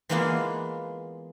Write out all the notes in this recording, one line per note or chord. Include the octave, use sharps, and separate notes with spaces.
E3 G#3 A#3 B3 F4 D5